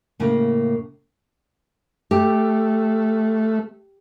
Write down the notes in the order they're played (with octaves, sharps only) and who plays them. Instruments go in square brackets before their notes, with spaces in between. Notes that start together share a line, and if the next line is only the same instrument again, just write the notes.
[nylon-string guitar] A2 C#3 A#3
[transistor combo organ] A3 [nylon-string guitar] G4